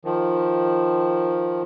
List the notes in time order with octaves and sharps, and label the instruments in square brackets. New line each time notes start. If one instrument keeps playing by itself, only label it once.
[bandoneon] D#3 F3